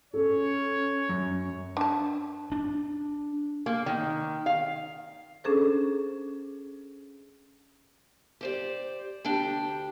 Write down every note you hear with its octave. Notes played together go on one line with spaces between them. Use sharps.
C#4 A4 C#5
F#2
D4 A5
D4
A#3
D#3
F5
C#4 D4 G#4 A4 C5
G4 C5 D5
D2 D4 G4 G5